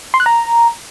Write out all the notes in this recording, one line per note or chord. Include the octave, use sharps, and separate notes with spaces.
C6
F#6
A#5